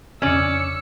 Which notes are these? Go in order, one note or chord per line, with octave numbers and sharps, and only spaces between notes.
F2 C#3 C#4 D4 D5 E6 C#7